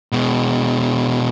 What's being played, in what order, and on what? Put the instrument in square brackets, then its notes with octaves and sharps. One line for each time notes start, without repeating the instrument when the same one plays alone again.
[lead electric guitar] B2 G#3